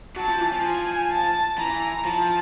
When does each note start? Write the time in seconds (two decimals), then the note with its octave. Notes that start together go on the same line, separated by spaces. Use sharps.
0.17 F#3 A5
0.29 F3
0.41 E3
0.53 F3
0.64 G#5
1.11 A5
1.58 E3 A#5
2.05 F3 A5